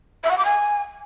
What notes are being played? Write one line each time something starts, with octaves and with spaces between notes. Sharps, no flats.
E5
F#5
D6
G#5